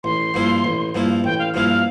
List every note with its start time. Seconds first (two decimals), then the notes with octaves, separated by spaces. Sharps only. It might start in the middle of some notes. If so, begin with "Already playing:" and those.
0.04 A1 C6
0.34 G2 F3 A#3 E4
0.64 A1
0.95 G2 F3 A#3 E4
1.24 A1 G5
1.39 F5
1.54 G2 F3 A#3 E4 F5
1.69 F5